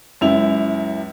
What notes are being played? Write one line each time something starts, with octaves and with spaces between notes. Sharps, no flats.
C#2 F#2 E4 F7